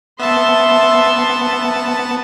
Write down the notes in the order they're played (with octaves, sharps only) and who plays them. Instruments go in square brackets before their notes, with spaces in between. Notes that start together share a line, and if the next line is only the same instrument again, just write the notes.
[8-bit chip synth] B3 A5 [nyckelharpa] E5 C6